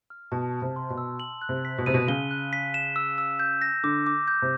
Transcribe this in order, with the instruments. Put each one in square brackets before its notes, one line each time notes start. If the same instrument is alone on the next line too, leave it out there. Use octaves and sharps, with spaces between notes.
[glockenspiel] F6
[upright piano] B2 [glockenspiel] A5
[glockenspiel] A5
[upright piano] C3
[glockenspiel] C6
[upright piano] B2
[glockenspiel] E6
F#7
F#6
[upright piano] C3
[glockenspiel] B6
[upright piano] B2
[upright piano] C3 [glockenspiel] D#7
[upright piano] B2
[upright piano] C#3 [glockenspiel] G7
[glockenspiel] F#6
B6
E7
E6
E6
G6
A#6
[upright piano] D3 [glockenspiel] D6
[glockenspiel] D6
G6
[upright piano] C3